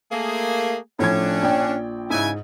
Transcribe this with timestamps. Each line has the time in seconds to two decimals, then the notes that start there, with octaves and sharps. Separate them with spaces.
0.12 A3 A#3 G#4
0.99 A2 F3 C#4 D4 G#6
1.42 A#1 D5 G5
2.10 G#2 C#3 E4 G#5